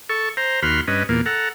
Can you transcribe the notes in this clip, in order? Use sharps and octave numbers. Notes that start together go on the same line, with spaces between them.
A4 C#6
C5 A#5
D#2 F#4 B5 C6 F6
G2 C#4 B4 D#5
E2 A#2 A#3
A4 F#5 A#5